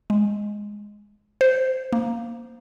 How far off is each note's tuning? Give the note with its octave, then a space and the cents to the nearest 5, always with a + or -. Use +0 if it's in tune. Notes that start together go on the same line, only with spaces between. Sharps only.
G#3 -5
C5 -10
A#3 +0